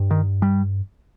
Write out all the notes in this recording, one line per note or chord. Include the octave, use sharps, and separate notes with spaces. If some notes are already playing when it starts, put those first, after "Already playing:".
Already playing: G2
D#3
G3